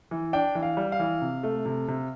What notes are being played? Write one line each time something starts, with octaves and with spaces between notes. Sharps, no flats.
E3
D4 G5
E3
F5
G3
F5
E3
C3
A3
C3
C3